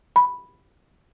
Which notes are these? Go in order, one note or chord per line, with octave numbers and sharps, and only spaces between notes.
B5